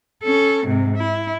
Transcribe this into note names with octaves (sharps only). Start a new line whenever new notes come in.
C#4 A4
G#2 C3
E4